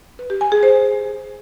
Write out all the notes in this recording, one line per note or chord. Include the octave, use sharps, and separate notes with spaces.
B4
G4
G#5
G#4
C5